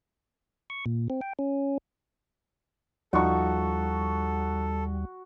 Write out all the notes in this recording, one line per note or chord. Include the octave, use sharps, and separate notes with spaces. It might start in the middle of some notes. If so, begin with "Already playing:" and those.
C#6
A#2
C4
G5
C#4
D#2 F3 G3 D#4 F#4 A4 C#6